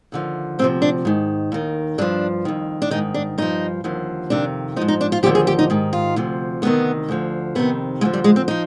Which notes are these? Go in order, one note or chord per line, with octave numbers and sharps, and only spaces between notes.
D#2 D3 F3
D2 C3 F3 C4
D4
G#2 D#3
D#2 D#3
G2 F3 D4
F2 D#3
D4
G#2 D#3 D#4
D4
G2 F3 D#4
D#2 D3 F3
F2 C3 D#3 D4
F3 D#4
G#2
D#4
D4
F4
D#2 D3 F3 G4
G#4
G4
D#4
G#2 D#3
F4
D2 C3 F3
D2 C3 D#3 B3
D2 D3 F3
F2 C3 D#3 B3
D2 D3 F3 G#3
G3
G#3
C4
F3 D#4